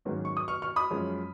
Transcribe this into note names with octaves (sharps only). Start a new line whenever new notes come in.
G#2 D#3 F#3 A#3 C#4
C#6
D#6
C#6 F6
C#6 F6
B5 D#6
F#2 F3 G#3 C#4